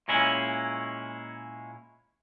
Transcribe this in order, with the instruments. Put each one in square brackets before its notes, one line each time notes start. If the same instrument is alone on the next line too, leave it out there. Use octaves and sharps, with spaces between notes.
[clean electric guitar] A#2 G#3 C#4 E4